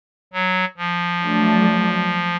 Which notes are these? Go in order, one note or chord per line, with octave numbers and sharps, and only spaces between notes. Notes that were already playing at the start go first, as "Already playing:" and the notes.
F#3
F3
F#3 A3 D4